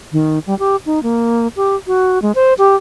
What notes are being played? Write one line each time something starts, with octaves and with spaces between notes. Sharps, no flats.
D#3
G3
G4
D#4
A#3
G4
F#4
G#3
C5
G4